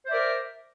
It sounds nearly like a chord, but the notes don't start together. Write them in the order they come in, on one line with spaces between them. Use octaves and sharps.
C5 E5 D5 A#4